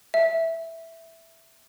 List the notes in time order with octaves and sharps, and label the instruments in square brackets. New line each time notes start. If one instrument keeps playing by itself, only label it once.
[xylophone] E5